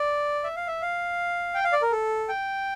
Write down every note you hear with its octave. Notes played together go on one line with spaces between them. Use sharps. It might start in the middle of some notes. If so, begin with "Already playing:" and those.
Already playing: D5
E5
F5
E5
F5
G5
F5
D5
A#4
A4
G5